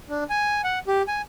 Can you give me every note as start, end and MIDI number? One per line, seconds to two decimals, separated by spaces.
0.10 0.24 62
0.30 0.62 80
0.64 0.79 78
0.87 1.02 67
1.08 1.22 80